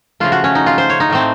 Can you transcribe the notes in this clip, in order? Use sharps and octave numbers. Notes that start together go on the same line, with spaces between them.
C#3 F3 A3 F4
F#4
C#4
D#4
F4
C5
C#5
D#4
A2 A3 C4